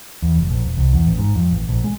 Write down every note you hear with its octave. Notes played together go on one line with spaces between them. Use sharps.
E2
F1
A#1
E1
C2
E2
A1
G#2
F2
A1
A#1
G#3